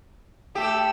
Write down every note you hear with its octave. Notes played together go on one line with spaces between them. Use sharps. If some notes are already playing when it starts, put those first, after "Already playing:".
A3 G4 E6